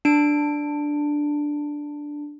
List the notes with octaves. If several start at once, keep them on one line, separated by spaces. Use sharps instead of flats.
D4 D7